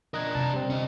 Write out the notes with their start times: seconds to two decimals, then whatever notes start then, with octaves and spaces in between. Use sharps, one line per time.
0.14 D4 A#4 D#5 F#6 G#6
0.35 C3 E4 A5
0.53 G3 C4
0.70 D3 C#4 D#5